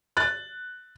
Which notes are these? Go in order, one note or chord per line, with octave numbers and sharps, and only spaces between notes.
F#6 A6